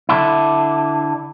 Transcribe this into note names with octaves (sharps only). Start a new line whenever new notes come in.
D3 D4 E4